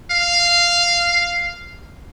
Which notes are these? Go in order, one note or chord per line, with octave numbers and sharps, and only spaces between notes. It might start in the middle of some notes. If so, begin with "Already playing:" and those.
F5